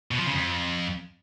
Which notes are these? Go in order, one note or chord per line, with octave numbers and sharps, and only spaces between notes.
B2
F3
C#3
F2